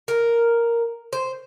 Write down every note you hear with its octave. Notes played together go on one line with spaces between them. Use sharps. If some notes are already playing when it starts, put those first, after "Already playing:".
A#4
C5